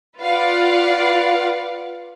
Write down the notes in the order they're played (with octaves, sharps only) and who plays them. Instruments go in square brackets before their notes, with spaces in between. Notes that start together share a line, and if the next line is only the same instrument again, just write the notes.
[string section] F4 B4 D5 F5 F#5